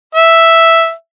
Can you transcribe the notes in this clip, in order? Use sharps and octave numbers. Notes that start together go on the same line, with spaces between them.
E5